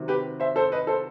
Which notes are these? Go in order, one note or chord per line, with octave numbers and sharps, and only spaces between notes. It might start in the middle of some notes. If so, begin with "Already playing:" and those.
Already playing: C3 D#3 F#3
G4 B4
C5 E5
A4 C5
B4 D#5
A4 C5